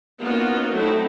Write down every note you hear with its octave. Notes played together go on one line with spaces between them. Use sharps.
A#3 B3 C#4 D#4 F4 F#4
F#3 A3 C4 D#4 E4